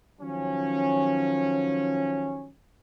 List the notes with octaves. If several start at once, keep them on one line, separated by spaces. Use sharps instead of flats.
D#3 F3 F#3 C#4